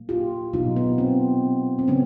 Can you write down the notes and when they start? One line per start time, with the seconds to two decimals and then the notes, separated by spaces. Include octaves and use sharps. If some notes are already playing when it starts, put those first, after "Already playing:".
Already playing: A#2 F#3 A#3
0.09 F4 G4
0.53 B2 F#3 B3 D#4 F4
0.76 B3
0.98 C4
1.79 C4
1.88 C#3 F#3 B3 C#4